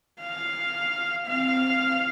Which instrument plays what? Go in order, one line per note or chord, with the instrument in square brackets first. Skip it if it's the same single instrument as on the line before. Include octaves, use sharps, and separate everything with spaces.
[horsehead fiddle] F5
[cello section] C4 [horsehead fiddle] F5